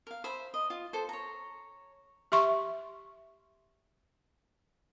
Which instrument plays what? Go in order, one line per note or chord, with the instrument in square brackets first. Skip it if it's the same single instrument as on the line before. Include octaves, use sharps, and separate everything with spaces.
[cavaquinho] A#4 F5
C5 E5 B5
D#5
F4
A4 C5
C#5 A#5
[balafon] G4 E5 C6 C#6